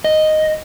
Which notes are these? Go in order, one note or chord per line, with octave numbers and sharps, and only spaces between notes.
D#5